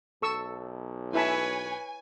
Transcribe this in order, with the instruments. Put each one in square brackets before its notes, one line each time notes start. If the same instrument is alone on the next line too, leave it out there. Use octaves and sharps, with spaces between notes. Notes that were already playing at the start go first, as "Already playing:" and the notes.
[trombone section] B1 [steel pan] A4 C#6 E6
[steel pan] E4 E5 A5 [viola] B4 C#5 [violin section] G#5